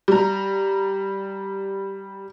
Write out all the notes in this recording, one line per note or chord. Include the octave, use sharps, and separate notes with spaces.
G3 A#5